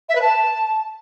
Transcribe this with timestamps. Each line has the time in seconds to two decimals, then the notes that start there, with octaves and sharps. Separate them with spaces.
0.09 E5
0.15 B4
0.22 A5